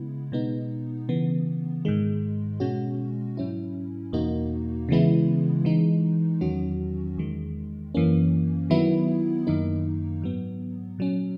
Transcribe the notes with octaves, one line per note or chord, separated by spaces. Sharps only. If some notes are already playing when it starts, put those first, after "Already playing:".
Already playing: C#3 G#3 B3 E4
B2 G#3 B3 D#4
C#3 E3 B3
G#2 D#3 G#3
B2 G#3 C#4 F#4
G#2 F#3 C#4 E4
E2 B2 A#3 D#4 F#4
C#3 E3 G#3 B3 E4
E3 G#3 D#4
E2 D#3 F#3 C#4 F#4
E2 D#3 G#3
F#2 E3 A#3 C#4
D#3 F#3 B3 E4
F#2 D#3 A#3 D#4
G#2 F#3 B3
A#2 F#3 C#4